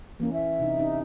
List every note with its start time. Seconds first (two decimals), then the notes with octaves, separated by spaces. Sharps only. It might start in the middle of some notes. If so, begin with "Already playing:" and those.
0.20 E3 A#3 C#4
0.33 E5
0.59 C3 D#4
0.78 C#4 D#4